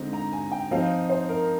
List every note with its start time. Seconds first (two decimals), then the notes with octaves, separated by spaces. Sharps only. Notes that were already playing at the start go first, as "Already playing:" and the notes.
Already playing: D3 G#3 C4 D#4
0.13 A#5
0.33 G#5
0.52 G5
0.71 F3 C4 D#4 F5
1.09 C5
1.29 A#4